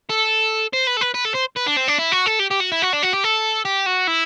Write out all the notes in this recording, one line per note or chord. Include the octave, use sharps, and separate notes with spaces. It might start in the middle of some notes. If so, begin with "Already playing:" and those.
A4
C5
B4
A4
B4
B4
A4
C5
B4
D4
C4
D4
E4
F#4
A4
G4
G4
F#4
E4
F#4
D4
F#4
G4
A4
G4
F#4
E4